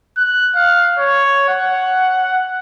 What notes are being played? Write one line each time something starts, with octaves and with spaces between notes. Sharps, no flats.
F#6
F5
C#5
F#5